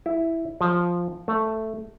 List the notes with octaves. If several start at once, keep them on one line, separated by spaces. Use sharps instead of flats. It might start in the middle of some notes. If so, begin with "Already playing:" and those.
E4
F3
A3